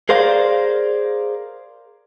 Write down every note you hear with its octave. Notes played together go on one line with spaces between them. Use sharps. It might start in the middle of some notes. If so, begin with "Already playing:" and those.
G#4 A#4 C5 D5 F5